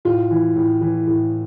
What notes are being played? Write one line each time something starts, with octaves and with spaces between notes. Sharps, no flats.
A2 F4
E3
A2
E3
A2